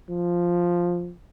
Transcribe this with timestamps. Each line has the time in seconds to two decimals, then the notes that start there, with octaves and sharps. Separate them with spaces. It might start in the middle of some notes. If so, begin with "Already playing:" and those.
0.10 F3